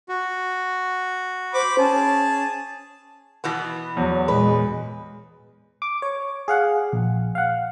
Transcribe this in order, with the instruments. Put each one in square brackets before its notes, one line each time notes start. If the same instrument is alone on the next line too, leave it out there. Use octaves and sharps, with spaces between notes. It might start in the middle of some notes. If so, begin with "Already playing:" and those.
[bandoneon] F#4
[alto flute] C5 [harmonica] B5 D6
[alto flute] C#4 [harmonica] G#4 A5
[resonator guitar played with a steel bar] B2 E3 B3
[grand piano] E2 [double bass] F#3
[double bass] A#2 G#3 [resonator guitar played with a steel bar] B4
[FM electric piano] D6
C#5
G#4 F5 F#5
A#1
F5 F#5